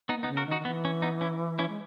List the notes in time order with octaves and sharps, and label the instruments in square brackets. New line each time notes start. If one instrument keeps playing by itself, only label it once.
[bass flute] A#3 [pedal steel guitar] B3 D#4
[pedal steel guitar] B3 D#4
[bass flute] C#3
[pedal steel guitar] F#4 A#4
[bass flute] D#3
[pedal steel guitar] D#4 F#4
[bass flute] D#3
[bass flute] E3 [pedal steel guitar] B3
[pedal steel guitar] C#4
B3 D#4
C#4 E4
C#4 E4
[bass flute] G#3